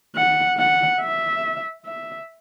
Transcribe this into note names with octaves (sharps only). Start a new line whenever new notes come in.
F#5
F#5
E5
E5